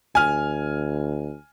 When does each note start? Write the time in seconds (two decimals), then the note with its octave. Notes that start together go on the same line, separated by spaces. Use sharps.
0.15 D2 G#5 F6